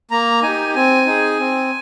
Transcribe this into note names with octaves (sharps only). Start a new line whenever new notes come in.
A#3 A#5
D#4 G4 G#5
C4 G#5
D#4 G#4
C4